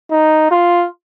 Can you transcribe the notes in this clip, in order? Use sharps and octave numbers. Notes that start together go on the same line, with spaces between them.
D#4
F4